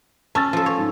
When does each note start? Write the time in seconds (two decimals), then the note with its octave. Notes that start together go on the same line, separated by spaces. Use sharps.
0.35 C#4 A5 E6 A6
0.53 F3 A4
0.66 C#5
0.78 G#2